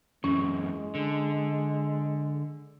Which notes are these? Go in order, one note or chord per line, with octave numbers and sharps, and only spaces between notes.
F#2 E3 G#3 C#4
D3